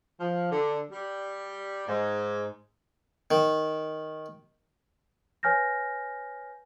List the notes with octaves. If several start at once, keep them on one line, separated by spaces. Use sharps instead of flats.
F3
D3
G3
G#2
D#3
B4 C#5 G#5 F6 G6 A#6